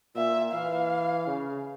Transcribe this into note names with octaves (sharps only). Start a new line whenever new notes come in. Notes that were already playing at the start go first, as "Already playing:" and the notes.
A#2 E5
E3 F5
C#3